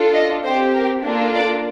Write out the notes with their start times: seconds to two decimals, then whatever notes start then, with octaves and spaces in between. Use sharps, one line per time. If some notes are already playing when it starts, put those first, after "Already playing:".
Already playing: D4 F4 A4
0.13 D#5
0.44 C4 G4 C5
0.74 A#4
1.03 A#3 D4 F4 A4
1.34 D5